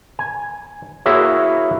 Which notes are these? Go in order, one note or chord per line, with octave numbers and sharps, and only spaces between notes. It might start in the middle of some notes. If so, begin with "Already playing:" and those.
G#5
A#3 E4 F#4 G#4 C#5 E5